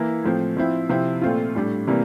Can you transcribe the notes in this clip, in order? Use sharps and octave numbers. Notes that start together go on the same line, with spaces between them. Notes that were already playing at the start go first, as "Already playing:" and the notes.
Already playing: E3 A#3 E4
A2 F3 C4
F3 C4 E4
C3 F3 C4 E4
A#2 A3 C4 F4
A2 G3 D4
C3 E3 G3 A#3